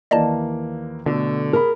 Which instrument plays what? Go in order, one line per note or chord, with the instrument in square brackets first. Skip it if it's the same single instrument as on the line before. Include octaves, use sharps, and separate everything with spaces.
[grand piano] D#2 E3 A#3 [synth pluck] D5 D#5 A5
[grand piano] B2 A3 [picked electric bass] D3
[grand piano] G#4 B5 [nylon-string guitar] A#4